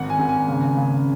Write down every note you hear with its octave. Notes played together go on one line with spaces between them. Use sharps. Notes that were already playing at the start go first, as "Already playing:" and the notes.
Already playing: G#1 F#5
G#5
G#1
G#5
C#3
C#3